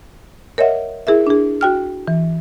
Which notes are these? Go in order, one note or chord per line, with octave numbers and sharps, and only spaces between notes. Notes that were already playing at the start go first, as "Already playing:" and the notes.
A#4 C#5 D#5 E5 F#5
E4 G#4 A#4 E5
D4 G#4
F#4 G5 F6
E3